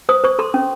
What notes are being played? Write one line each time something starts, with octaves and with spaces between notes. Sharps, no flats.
C5 D#6
C5 C#6
A4 C6
C#4